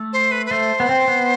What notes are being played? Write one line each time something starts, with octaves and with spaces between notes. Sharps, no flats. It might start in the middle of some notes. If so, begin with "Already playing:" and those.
Already playing: A3
C5
B4
B4
A3 C5
B3
C4
B3